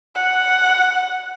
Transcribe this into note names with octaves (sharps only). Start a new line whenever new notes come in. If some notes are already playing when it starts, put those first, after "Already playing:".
F#5